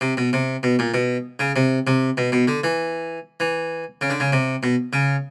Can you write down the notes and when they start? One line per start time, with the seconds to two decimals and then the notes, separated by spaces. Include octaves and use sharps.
0.01 C3
0.17 B2
0.33 C3
0.63 B2
0.79 A#2
0.94 B2
1.39 C#3
1.56 C3
1.87 C3
2.17 B2
2.32 B2
2.48 D3
2.64 E3
3.40 E3
4.01 C#3
4.10 D3
4.20 C#3
4.32 C3
4.63 B2
4.93 C#3